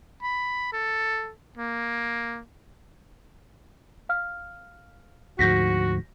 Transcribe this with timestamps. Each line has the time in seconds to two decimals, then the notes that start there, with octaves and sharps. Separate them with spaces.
0.23 B5
0.73 A4
1.58 A#3
4.09 F5 F6
5.39 D2 G#2 F3 F#4 G6 A#6 B6